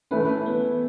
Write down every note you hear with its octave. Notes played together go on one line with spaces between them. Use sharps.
E3 A3 C#4 E4 B4
B3